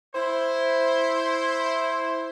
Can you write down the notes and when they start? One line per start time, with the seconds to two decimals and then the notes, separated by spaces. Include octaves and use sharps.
0.15 E4 C5